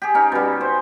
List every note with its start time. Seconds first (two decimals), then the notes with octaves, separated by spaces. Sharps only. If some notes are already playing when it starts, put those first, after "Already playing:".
0.02 G4 G#4
0.15 C#4 D#4
0.32 B2 G3
0.61 C5